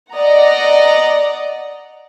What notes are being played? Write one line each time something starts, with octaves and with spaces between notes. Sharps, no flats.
D5 D#5 F#5 A#5